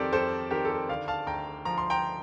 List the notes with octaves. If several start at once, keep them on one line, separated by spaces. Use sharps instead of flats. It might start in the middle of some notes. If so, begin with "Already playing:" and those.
Already playing: F2 D#3 G4 A4 A#4 C5 D5
F2 A4 C5
D#3 G4 A#4
A4
G4
D3 D5 F5
F5 A5
D2 G5 A#5
F3 A#5
C6
G5 A#5